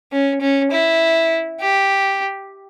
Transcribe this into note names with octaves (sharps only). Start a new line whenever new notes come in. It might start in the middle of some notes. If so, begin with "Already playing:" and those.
C#4
C#4
E4
G4